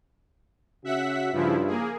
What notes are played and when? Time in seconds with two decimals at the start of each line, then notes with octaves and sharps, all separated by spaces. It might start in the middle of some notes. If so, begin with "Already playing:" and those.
0.85 C#3 C#4 F#4 E5 F#5 B6
1.33 G2 C#3 F3 E4 F4
1.67 A#3 G#4